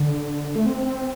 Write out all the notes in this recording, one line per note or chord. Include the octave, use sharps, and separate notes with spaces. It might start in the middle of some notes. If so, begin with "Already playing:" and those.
Already playing: D3
A3
C4
C4